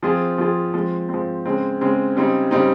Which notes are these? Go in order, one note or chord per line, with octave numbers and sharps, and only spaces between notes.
F3 C4 F4 G#4
F3 C4 F4 G#4
F3 G#3 C4
F3 G#3 C4
C#3 G#3 C4
C#3 G#3 C4
C#3 G3 C4 D#4
C#3 G3 C4 D#4